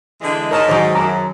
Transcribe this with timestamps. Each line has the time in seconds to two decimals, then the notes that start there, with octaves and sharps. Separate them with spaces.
0.21 D3 E3 G#3
0.51 G#2 D#4 A#4 C#5 A5
0.68 D#3 F#3 G#4 C5 D5
0.95 F#2 G#4 A5 A#5 D6